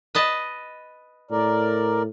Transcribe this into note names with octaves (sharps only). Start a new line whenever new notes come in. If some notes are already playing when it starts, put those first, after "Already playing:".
B4 D#5 A5
A2 A#4 D5